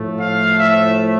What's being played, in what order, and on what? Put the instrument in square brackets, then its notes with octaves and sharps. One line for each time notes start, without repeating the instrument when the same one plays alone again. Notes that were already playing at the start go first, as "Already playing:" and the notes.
Already playing: [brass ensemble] A2 F3 A3
F5
E5